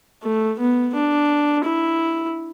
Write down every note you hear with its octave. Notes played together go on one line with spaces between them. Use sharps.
A3
B3
D4
E4